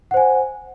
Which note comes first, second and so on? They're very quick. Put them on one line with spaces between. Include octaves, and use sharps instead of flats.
F#5 C5 G#5